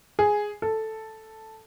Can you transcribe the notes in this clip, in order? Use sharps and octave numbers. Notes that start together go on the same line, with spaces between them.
G#4
A4